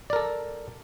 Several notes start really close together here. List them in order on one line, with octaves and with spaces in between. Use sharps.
D5 A#4 A4